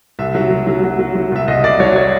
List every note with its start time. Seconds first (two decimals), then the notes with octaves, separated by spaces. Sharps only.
0.19 C2 E5
0.35 F#3
0.51 F#3
0.67 F#3
0.84 F#3
0.99 F#3
1.15 F#3
1.32 C2 E5
1.48 C2 D#5
1.64 C2 D5
1.80 F#3 C#5
1.96 C#5